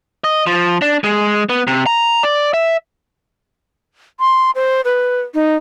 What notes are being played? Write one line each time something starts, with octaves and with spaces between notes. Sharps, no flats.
D#5
F3
D4
G#3
B3
C3
A#5
D5
E5
C6
C5
B4
D#4